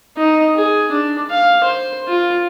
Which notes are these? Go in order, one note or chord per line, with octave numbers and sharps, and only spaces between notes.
D#4
G#4
D4
F5
C5
F4